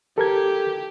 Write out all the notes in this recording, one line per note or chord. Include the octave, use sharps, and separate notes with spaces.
G4 A4 A#4 G#6